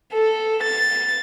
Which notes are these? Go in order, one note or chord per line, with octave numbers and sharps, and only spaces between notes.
A4
A6